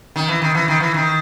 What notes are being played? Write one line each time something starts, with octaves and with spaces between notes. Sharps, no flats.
D#3
E3
D#3
E3
D#3
E3
D#3